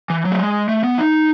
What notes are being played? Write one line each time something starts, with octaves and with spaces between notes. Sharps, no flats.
E3
F#3
A3
G#3
A3
B3
D#4